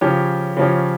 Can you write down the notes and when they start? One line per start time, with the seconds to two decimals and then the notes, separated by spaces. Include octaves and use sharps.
0.01 C#3 F3 C#4 G4
0.57 C#3 F3 C#4 G4